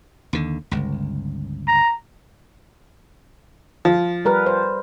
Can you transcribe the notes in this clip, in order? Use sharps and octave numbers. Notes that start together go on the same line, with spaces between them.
D#2 D3
G1 C#2
A#5
F3
G3 A#4 B4
C5